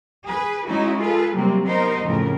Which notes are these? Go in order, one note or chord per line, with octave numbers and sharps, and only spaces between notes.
G#4 B4
G#3 C#4 D#4 E4 F#4
F4 G#4 A4 B4
C3 F#3 G3 A#3 C4
B3 D#4 A#4 C5
F2 A2 C#3 A3 A#4